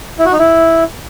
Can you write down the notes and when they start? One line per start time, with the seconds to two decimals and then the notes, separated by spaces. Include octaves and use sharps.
0.19 E4
0.26 F#4
0.32 D#4
0.39 E4